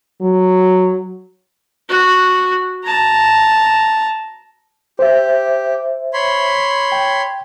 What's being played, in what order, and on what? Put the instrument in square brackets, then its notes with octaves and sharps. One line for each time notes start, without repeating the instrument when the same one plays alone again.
[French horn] F#3
[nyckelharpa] F#4
A5 A#5
[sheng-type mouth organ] G4 [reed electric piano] C5 E5
[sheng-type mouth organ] C#5 B5 C6
[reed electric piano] G5